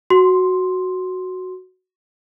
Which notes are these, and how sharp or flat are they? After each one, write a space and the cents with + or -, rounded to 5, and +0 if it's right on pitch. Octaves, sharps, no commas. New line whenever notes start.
F#4 +0 C6 +0